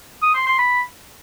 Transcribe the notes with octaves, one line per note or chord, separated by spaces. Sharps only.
D#6
C6
C6
B5